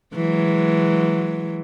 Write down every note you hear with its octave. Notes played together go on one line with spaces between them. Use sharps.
E3 F#3 G#3